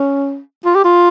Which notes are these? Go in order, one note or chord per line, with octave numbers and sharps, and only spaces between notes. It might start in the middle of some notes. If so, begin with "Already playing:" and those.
Already playing: C#4
F4
G4
F4